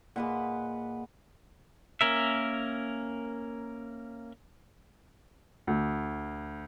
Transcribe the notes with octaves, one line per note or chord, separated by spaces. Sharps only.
A#2 G#3 B4 F#5
A#3 C#4 A#4 E5
D2